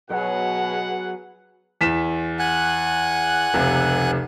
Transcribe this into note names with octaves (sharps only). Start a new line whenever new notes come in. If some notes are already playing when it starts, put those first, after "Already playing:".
B2 F#3 B3 G#4 F#5
E2 B6 E7
F#5 G#5 F#6
F1 C#2 C3